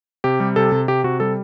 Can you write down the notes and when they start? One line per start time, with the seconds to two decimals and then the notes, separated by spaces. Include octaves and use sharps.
0.24 C3 G4
0.40 G3
0.56 C3 A4
0.72 C3
0.88 C3 G4
1.04 C3 F#4
1.20 G3 A4